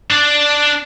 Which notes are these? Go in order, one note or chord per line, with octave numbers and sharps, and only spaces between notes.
D4 D5